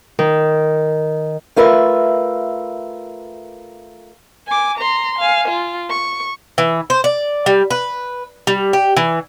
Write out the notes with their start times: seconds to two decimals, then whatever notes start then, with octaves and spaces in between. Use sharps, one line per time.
0.19 D#3
1.56 A3 F4 A#4 B4 E5
4.47 G#5 D6
4.78 A#5 C6
5.19 F5 G#5
5.48 F4
5.90 C#6
6.58 E3
6.90 C5
7.04 D5
7.46 G3
7.71 B4
8.47 G3
8.73 G4
8.97 E3